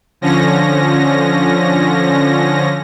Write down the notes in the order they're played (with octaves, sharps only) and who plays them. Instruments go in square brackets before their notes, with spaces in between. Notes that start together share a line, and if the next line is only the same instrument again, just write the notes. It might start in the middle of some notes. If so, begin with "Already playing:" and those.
[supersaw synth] D3 F3 C#4 A#6